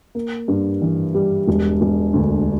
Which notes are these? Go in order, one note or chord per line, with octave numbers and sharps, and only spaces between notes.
A#3
G2
E3
G3
E1
E1
D2